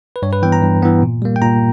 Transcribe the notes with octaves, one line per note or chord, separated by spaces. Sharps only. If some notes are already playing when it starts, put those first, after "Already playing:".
B4
G2 C#5
B4
E3 B3 G5
A#5
G2
E3 B3
A#2
G3 A#3
G5
A#2 A#5